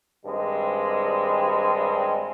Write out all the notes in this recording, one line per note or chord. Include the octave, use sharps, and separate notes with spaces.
G2 D#3 G3 G#3 C4